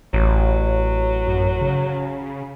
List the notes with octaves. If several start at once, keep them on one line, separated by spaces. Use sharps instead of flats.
A1 F#3
F#2
C#3